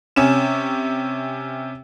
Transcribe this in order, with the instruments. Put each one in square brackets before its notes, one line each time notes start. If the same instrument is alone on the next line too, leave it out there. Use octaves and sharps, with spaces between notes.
[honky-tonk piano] C3 C#4 E7